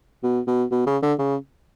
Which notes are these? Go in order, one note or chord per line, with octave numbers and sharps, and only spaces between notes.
B2
B2
B2
C#3
D3
C#3